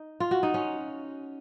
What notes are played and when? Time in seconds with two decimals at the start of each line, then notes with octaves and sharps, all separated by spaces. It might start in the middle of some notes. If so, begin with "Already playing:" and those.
Already playing: D#4
0.20 F4
0.31 F#4
0.43 D#4
0.54 C#4